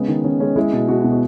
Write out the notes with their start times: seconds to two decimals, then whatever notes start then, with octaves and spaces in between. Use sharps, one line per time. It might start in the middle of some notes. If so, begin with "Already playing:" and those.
Already playing: C#3 G#3 B3
0.08 D#3
0.24 D#3 C#4
0.40 G#3 C#4
0.56 G#3 E4
0.73 B2
0.88 B2 F#4
1.00 B2 E4
1.12 F#4